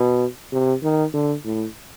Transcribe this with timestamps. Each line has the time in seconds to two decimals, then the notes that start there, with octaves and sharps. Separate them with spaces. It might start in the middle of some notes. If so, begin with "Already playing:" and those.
Already playing: B2
0.52 C3
0.83 D#3
1.14 D3
1.45 A2